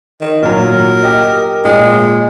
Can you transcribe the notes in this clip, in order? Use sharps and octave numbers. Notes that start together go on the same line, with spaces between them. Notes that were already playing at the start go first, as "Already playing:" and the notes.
D#3
A#2 F#3 A#4
G4 D#5
A#2 G#3